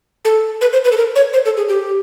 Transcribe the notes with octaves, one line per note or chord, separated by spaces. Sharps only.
A4
B4
C5
B4
A4
A#4
C#5
C5
A4
G#4
G4